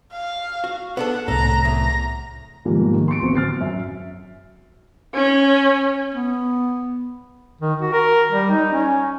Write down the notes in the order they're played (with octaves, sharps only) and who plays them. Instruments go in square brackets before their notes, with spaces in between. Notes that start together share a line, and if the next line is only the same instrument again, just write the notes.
[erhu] F5
[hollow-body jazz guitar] F#4
[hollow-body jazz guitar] B3 D4 A4 [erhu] F#5
[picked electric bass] C2 A2 [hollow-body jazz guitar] A4 [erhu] A#5
[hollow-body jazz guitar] E2 [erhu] A#5
[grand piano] G#2 B2 D#3 F3 G3 A#3
D#3
C6 C#6 C#7 D7
D1 A1 B3 C4 C5
F6 A6 C7
F#2 E5
[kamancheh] C#4
[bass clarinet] B3
[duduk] D#3
F#4
A#4
G3
D#4
C#4